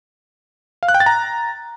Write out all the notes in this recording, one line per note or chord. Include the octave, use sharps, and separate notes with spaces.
F5
F#6
G5
A6
A#5